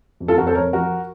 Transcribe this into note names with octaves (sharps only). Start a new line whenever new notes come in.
F2
F4 A4
F2 F#4 A#4
A4 C5
F2 A#4 C#5
F3 F#4 A#4